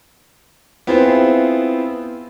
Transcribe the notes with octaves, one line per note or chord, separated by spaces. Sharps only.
B3 C4 E4 F4 G#4 C5